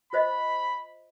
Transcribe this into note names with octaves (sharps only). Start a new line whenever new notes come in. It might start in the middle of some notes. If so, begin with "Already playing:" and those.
F4 C5 D#5 B5